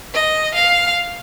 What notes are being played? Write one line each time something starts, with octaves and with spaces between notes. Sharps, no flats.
D#5
F5